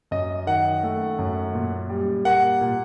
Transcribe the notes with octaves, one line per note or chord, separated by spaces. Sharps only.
F#2 D#5
D#3 F#5
A3
F#2
A#2
G3
A#3 F#5
A#2